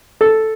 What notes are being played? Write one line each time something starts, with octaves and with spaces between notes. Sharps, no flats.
A4